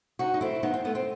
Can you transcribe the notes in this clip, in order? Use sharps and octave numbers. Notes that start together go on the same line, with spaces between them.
C3 D#4 F#4
D#4
D#3 A3 C4 E4
D#3 B3 D#4
C4
A3 B3
C4